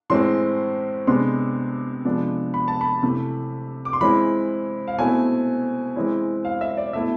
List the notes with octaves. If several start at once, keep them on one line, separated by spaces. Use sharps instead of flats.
A2 E3 G#3 C4 C6
C3 G#3 B3 D4 C6
C3 F3 G#3 B3 D4
B5
A5
B5
C3 E3 A3
D6
C6
E3 G#3 C4 E4 B5
F5
B2 A3 C4 E4 G#5
E3 G#3 C4 E4
F5
E5
D5
B2 A3 E4 E5